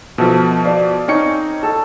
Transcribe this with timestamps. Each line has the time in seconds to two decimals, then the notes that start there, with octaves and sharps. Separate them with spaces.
0.18 B2 F3 A4 E5
0.64 D5 F5
1.08 C4 C#4 D#4 C#7
1.63 A4